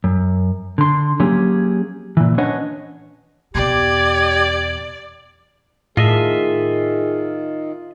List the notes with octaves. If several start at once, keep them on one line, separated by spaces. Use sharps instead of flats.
F#2
D3 C6
F#3 A#3 C#4 G4 G#4
A#2 E3
C#4 D4 B4 C#5 D#5 F#5
E2 B2 G4 D5 G#6
A2 D#3 F4 G#4 D#5 E5